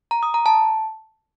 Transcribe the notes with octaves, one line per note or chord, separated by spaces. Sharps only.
A#5
D#6
A#5
A5